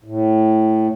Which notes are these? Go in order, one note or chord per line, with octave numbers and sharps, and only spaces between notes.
A2